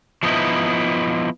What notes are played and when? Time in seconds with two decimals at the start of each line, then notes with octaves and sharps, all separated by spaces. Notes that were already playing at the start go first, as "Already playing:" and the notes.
0.23 F3 A3 B3 C#4 D#4 E4